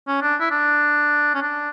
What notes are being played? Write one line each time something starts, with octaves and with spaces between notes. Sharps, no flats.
C#4
D4
E4
D4
C#4
D4